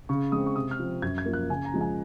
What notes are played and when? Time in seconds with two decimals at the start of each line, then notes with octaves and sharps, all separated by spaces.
0.09 C#3 C#6
0.32 G#3 C4 D#6
0.46 C#6
0.56 C3 D#6
0.71 F6
0.79 F3 C4
1.02 F#2 G#6
1.18 G#6
1.26 F3 A#3
1.33 F#6
1.50 C#3 G#5
1.65 A#5
1.74 F3 G#3
1.81 G#5